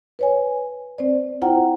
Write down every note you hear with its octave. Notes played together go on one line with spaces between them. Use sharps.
B4 C#5 G#5
C4 C5 D5
E4 F4 C5 F#5 G5 A#5